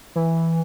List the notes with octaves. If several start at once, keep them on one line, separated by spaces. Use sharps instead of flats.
E3